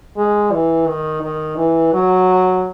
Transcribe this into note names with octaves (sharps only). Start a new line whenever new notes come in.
G#3
E3
D#3
D#3
E3
F#3